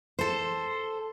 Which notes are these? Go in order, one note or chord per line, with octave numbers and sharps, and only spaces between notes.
A4 C5